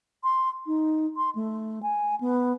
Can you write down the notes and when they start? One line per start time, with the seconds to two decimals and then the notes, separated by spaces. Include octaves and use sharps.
0.24 C6
0.66 D#4
1.17 C6
1.35 A3
1.83 G#5
2.21 B3